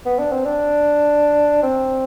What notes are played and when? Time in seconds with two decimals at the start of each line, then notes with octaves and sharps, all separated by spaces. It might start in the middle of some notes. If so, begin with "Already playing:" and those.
0.06 B3
0.19 D4
0.32 C4
0.45 D4
1.63 C4